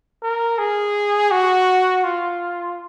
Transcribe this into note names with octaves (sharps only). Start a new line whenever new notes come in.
A#4
G#4
F#4
F4